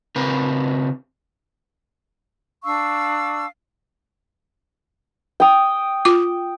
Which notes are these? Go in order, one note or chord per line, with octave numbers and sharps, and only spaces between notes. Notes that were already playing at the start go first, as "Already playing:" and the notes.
C#3 C4 A#4 B4
D4 F5 C#6 E6
G5 D#6
F4 D6